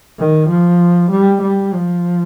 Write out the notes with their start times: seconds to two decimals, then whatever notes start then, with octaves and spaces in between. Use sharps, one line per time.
0.19 D#3
0.49 F3
1.11 G3
1.42 G3
1.73 F3